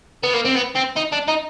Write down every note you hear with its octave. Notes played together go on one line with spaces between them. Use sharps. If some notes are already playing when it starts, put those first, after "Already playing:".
B3
A#3
C4
B3
C4
D#4
D4
D#4